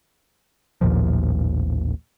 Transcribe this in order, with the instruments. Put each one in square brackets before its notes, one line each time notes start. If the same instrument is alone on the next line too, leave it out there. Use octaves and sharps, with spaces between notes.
[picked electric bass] A1 D#2 A#2 F3